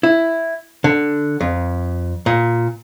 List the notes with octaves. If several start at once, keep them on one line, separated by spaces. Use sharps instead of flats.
E4
D3
F2
A#2